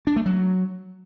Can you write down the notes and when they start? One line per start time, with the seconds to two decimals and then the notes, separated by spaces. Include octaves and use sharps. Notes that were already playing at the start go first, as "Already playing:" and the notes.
0.07 D4
0.16 A3
0.26 F#3